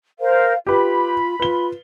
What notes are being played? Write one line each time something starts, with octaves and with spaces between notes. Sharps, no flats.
A#4 C5 F5
F4 G4 B4 B5
F4 B4 G7